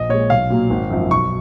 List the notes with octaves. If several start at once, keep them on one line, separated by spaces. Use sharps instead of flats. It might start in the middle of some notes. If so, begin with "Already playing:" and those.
Already playing: A#1 D#5
A#2 G#3 C#5
B1 F5
A#2 F#3 A#3
G#1
F#2 F3
B1 C#6